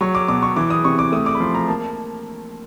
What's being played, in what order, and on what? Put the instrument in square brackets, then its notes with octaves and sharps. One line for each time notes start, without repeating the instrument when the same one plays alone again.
[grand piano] F#3 C#6
D6
B2 D6
C#6
E3 D6
D#6
C3 C#6
D6
A3 D#6
D6
B5
F3 C6
A#5
A#3 A5